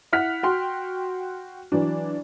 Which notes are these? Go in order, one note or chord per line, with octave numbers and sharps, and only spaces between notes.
E4 F#5 F6 F#6 B6
F#4 G5 C6
E3 F#3 D4